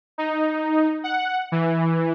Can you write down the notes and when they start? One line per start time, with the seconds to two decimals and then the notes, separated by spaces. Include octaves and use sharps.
0.18 D#4
1.04 F#5
1.52 E3